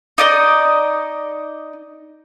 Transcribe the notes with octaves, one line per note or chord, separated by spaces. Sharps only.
D#4 D5 D#5